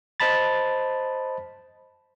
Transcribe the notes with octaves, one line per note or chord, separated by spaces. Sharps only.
C5 D#5 A5 B5 A6